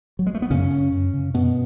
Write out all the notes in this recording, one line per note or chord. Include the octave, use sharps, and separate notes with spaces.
F#3
G#3
A3
B3
F#2 C#3 C#4
C#3
F#2
C#3
F#2 B2 B3